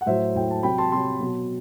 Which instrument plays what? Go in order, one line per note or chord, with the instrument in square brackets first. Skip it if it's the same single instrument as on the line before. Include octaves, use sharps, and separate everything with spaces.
[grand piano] F#5
A2 F#3 C5 E5
A2 F#3 G5
A5
C3 F#3 G5 B5
A5 C6
C3 F#3 A5 C6
B2 F#3